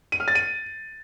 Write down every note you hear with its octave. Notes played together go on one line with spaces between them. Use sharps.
D#7
F6
A6
D#7